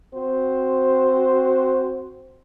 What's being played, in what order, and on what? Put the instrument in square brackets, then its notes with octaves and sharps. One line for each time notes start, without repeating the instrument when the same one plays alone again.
[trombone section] C4 F#4 C5